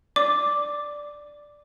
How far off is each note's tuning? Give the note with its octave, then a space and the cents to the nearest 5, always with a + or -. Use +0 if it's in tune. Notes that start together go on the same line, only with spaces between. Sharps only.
D5 +0 D6 +0